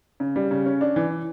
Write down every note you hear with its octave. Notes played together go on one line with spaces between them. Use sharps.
C#3
G3
C#3
C#4
D4
E3